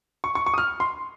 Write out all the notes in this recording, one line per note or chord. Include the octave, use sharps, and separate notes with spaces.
C#6
C#6
C#6
D#6
F6
C6